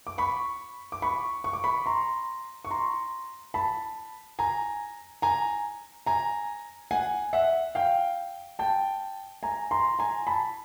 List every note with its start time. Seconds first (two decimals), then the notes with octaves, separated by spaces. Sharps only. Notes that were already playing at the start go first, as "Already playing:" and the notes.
0.07 D6
0.18 B5 C#6
0.92 D6
1.02 B5 C#6
1.44 C#6
1.53 D6
1.64 B5 C#6
1.86 A#5 C6
2.65 C#6
2.71 A#5 C6
3.54 A5 B5
4.39 G#5 A#5
5.22 G#5 A#5
6.06 G#5 A#5
6.91 F#5 G#5
7.33 E5 F#5
7.75 F5 G5
8.59 G5 A5
9.43 G#5 A#5
9.71 A#5 C6
9.99 G#5 A#5
10.27 A5 B5